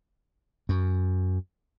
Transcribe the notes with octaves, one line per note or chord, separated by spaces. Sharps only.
F#2